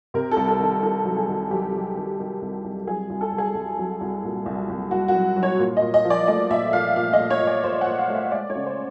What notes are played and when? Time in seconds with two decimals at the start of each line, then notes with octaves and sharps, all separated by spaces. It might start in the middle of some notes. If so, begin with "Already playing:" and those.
0.14 C3 A#4
0.31 A4
0.36 C2
0.48 A4
0.60 D#3
0.83 D#3 A4
1.05 F#3
1.17 G#4
1.27 D#3
1.51 F#3 G4
1.74 F#3
1.97 D#3
2.19 D#3
2.42 C2
2.64 C2
2.86 F#3 G#4
3.10 C2
3.21 A4
3.32 C2
3.38 G#4
3.55 C2
3.78 F#3
4.01 C2
4.23 A#2
4.46 C2
4.69 C2
4.91 C2 F#4
5.08 F#4
5.14 F#3
5.36 F#3
5.43 C#5
5.59 A#2
5.77 D#5
5.82 A#2
5.94 D#5
6.05 F3
6.10 D5
6.27 A3 D#5
6.50 A#2 E5
6.73 A#2 F5
6.96 A#2 F5
7.13 D#5
7.19 A#2
7.30 C#5
7.42 A#2
7.47 D5
7.64 A#2 C5
7.81 F#5
7.87 A#2
7.98 F5
8.10 A3 E5
8.32 G#3 D5
8.50 C#5
8.55 C#3
8.66 C5